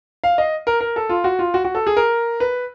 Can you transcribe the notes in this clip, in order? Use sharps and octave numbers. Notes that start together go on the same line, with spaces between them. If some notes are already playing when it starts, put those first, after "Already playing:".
F5
D#5
A#4
A#4
A4
F4
F#4
F4
F#4
F#4
A4
G#4
A#4
B4